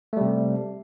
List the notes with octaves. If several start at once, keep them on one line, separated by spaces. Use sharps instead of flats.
C3 G3 A3